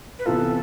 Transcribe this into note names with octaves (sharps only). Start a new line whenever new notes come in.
B4
C3 E3 B3 F4 A4